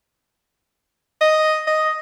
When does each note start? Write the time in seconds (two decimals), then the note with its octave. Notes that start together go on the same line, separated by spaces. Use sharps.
1.21 D#5
1.67 D#5